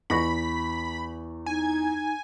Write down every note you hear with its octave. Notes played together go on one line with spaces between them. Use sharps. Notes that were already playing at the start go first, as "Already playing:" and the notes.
E2 B5 C#6 A#6
D#4 G#5